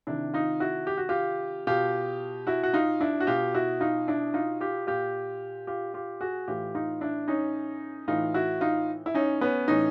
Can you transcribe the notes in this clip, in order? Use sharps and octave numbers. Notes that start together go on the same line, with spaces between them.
C3 D#3 D4 E4
D#4 F4
E4 F#4
G4
F#4
F4 G4
B2 F4 G4
E4 F#4
F#4
D#4 F4
D4 E4
F#4
B2 F4 G4
E4 F#4
D#4 F4
D4 E4
D#4 F4
F4 G4
A#2 F4 G4
F4 G4
F4 G4
F#4 G#4
A2 E3 F4 G4
D#4 F4
D4 E4
C#4 D#4
A2 E3 D#4 F4
E4 F#4
D#4 F4
E4
C#4 D#4
B3 C#4
A2 E3 C#4 D#4